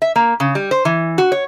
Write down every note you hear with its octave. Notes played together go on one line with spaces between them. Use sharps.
E5
A#3
C#3
G3
C5
E3
F#4
C#5